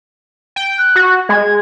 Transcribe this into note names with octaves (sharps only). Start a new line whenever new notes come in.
G5
F#6
F#4
G#3 G#6